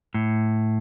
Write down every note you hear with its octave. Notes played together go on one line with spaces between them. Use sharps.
A2